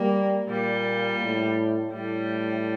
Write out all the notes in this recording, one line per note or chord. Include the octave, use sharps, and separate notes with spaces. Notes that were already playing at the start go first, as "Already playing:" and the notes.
Already playing: G3 A#3
A#2 G3
A2
A2 G3